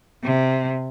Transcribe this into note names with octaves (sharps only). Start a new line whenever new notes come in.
C3